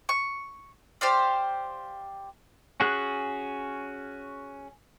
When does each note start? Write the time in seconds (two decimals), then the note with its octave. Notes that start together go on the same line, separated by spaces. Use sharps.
0.09 C#6
1.01 G4 C5 D5 F5
2.80 C#4 F#4 G#4 F#6